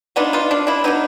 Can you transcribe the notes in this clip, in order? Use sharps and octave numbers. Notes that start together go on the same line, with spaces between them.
F#3 B3 D4 D#4 F4
D#4 F4
D4
D4 E4
F#3 B3 D4 D#4